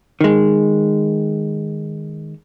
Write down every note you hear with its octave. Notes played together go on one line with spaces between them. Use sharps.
D#3 G#3